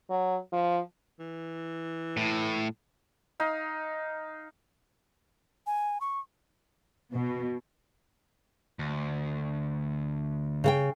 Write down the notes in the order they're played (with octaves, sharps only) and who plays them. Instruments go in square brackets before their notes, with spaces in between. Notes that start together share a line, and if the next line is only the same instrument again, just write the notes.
[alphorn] F#3
F3
[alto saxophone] E3
[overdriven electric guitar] A2
[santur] D#4 F5
[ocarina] G#5
C#6
[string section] B2
[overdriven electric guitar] D2
[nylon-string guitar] C#3 F#5 G5